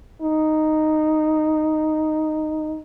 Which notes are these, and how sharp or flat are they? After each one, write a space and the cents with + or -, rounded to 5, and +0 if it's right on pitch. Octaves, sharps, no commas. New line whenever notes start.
D#4 -5